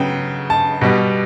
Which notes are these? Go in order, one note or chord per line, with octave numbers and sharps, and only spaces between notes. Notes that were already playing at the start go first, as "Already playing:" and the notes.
Already playing: C#3 F#3 B3 G5
A5
B2 G3 B3